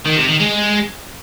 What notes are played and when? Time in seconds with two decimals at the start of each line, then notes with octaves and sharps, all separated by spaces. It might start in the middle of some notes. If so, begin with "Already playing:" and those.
0.05 D#3
0.17 C3
0.28 D#3
0.40 G#3